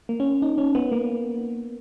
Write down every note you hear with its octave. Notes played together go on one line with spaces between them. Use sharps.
A#3
C#4
D#4
C#4
B3
A#3